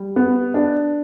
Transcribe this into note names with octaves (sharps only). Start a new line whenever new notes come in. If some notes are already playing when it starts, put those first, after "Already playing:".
Already playing: G3
B3
D4